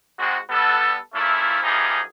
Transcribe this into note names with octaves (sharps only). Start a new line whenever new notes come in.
G#2 G#3 C4 F#4
G3 B3 A4
F3 A3 A#3 C#4 E4
F#2 E3 F3 D#4 G4 G#4